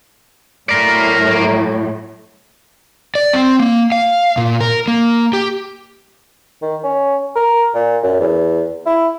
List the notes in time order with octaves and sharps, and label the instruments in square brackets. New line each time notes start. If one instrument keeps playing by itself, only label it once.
[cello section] A2 F#3 [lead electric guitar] A#4 D5
[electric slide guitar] D5
C4
A#3
F5
A#2
A#4
A#3
G4
[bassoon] D#3
C#4
A#4
A#2
F#2
E2
E4